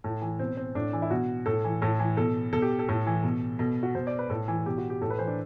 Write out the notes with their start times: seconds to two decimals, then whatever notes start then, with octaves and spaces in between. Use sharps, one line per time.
0.04 A2
0.22 E3
0.39 B2 C4
0.57 C4
0.75 A2 D4
0.93 E3
1.02 E4
1.10 B2 F#4
1.46 A2 A4
1.64 E3
1.82 A2 A4
1.99 E3
2.17 B2 A4
2.53 B2 A4
2.62 G4
2.79 A4
2.89 A2
3.07 E3
3.23 B2
3.59 B2 A4
3.83 F#4
3.95 B2 C5
4.07 D5
4.19 B4
4.30 A2 A4
4.48 E3
4.66 B2 G4
4.78 F#4
4.90 G4
5.01 A2 A4
5.10 B4
5.19 E3 C5
5.27 D4